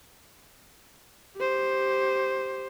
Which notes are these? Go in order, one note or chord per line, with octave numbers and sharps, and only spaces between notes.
G4 C5